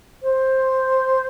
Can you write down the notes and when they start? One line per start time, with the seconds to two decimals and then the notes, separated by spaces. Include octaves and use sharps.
0.22 C5